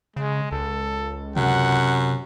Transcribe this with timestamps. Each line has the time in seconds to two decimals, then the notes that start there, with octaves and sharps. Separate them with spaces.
0.16 C#3 G#3
0.52 C#2 A4
1.36 F#2 C3 F#5